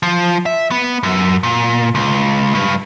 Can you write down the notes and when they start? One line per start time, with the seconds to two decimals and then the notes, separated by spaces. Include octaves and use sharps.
0.03 F3
0.46 E5
0.71 B3
1.03 F#2
1.43 A#2
1.95 C#2
2.55 G2